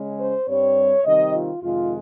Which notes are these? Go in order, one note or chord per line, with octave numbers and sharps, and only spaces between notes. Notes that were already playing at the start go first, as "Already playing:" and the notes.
Already playing: C#3 G#3 C#4
C5
G2 G3 C4 C#5
C3 D#3 G3 C4 D#5
F4
F2 C3 D#3 G#3 F4